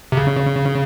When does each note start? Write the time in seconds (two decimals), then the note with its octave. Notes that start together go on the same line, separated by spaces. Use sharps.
0.12 C3
0.17 C#3